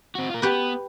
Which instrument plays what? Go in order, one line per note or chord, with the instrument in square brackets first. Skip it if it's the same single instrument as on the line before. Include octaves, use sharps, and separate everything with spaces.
[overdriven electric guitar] C4 F#4
F4 A#4
[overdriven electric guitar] B3 [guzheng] G4 B4